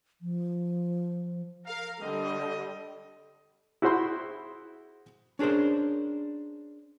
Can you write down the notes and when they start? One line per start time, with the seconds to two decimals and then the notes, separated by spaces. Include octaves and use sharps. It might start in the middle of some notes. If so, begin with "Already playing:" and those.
0.22 F3
1.66 A#4 F5
2.01 D3 G3 C4 D#5
3.82 E4 F#4 G#4 C5 B5 C6
5.39 C#4 D4 G#4 A#4 C5